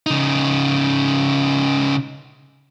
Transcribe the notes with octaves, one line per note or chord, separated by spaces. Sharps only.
C#3 D#4